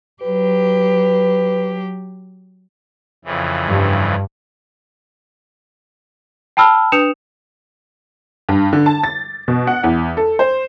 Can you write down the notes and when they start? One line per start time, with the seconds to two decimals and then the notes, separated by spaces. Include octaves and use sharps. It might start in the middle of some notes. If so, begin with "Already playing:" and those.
0.23 F#3 G4 B4
3.25 F2 C#3 E3
3.69 G2
6.57 G5 A5 B5 E6 F6
6.92 D4 B4 D#6 C#7 E7 F7
8.49 G2
8.73 D3
8.86 A5
9.04 A6
9.48 B2
9.67 F#5
9.84 E2
10.17 A4
10.39 C5